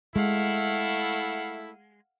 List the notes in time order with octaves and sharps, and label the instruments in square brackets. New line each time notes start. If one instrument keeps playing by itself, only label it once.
[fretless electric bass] G#3 [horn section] A3 E4 [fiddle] F5 F#5